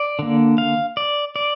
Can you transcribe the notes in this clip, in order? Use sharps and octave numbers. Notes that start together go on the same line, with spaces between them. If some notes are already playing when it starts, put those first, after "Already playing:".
Already playing: D5
D3 A#3
F5
D5
D5